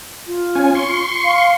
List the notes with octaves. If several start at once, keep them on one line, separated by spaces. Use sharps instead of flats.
F4
C#4 G#5
C6 C#6
F5